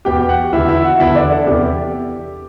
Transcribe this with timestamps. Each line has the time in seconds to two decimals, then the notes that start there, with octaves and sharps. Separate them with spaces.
0.05 E2 B2 G4 G5
0.29 F#4 F#5
0.53 E2 D3 E4 E5
0.68 E4 E5
0.84 F#4 F#5
1.00 E2 D3 E4 E5
1.15 D4 D5
1.31 A4
1.47 E2 C3 E3 G4